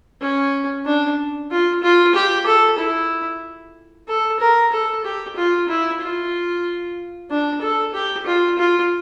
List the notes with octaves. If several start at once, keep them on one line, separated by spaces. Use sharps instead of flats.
C#4
D4
F4
F4
G4
A4
E4
A4
A#4
A4
G4
F4
E4
F4
D4
A4
G4
F4
F4